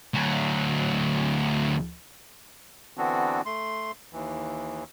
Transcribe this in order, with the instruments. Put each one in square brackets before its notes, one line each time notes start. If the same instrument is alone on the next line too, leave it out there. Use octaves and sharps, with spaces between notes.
[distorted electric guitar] D2 F#3
[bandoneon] D3 E3 B3 C4 D4 F#4
A3 C6
D#2 E3